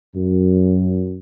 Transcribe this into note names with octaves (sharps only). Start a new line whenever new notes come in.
F#2